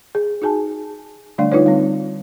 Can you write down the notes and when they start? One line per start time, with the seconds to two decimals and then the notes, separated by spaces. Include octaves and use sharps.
0.15 G#4
0.42 D#4 F#4 G#4 G#5 A5
1.38 D3 G3 A3 D4 D5 F5
1.52 D#4 F4 B4 C#5
1.66 G3 C4